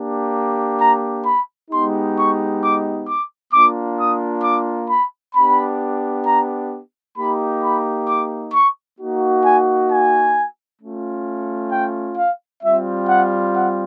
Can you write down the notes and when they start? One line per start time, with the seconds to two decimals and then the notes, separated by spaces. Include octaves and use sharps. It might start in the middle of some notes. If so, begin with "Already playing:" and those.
Already playing: A#3 D4 G4
0.79 A#5
1.25 B5
1.71 G#3 B3 D#4 G4 C6
2.17 C#6
2.62 D6
3.08 D6
3.52 A#3 D4 F4 D6
3.99 D#6
4.43 D6
4.89 B5
5.34 B3 D4 G4 B5
6.25 A#5
7.16 A#3 D#4 G4 B5
7.63 B5
8.08 D6
8.53 C#6
8.98 A#3 D#4 F#4
9.44 G#5
9.90 G#5
10.80 A3 C#4 F4
11.71 G5
12.17 F5
12.62 G3 C4 F4 E5
13.08 F#5
13.54 F#5